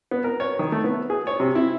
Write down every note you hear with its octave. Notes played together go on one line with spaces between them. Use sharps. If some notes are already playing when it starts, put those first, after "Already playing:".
B3
A#4
C#5
D#3
A3
B3
G#4
C#5
C3
E4